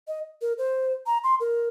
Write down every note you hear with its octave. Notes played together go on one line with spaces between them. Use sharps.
D#5
A#4
C5
A#5
C6
A#4